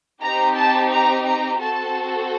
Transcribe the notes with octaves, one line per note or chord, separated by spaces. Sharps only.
C4 D#4 G4 A#5
A5
A#5
A#5
C4 F#4 A4 A5